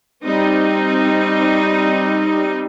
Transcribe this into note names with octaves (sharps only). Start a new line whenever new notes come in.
G3 C4 D#4